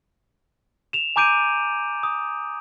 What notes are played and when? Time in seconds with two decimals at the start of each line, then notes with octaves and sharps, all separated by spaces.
0.93 E7 F7
1.16 G#5 A#5 D6 G6 D7 D#7
2.03 D#6